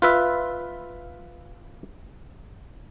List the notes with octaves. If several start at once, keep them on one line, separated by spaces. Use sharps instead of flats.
F4 B4 E5